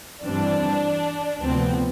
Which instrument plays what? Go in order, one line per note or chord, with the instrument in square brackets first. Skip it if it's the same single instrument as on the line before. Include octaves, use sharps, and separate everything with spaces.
[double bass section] G2 E3 G3 C4 [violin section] D4
[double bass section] D2 C3 F3 B3 [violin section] C4